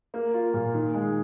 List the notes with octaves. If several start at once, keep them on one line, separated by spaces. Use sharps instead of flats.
A#3
F4
A#2
D#3
G#3